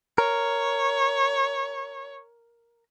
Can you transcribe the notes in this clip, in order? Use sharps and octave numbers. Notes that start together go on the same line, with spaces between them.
A#4 C#5